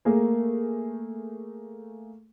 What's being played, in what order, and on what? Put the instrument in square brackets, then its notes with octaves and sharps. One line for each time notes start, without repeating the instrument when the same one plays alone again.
[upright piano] A3 A#3 G#4 A#4